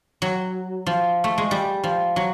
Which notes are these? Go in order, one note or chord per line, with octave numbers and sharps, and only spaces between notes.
F#3
F3
A3
G#3
G3
F3
F#3